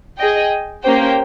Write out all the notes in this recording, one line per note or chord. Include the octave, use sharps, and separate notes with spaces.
G#4 D#5 G5
A#3 C#4 G4 C5 G5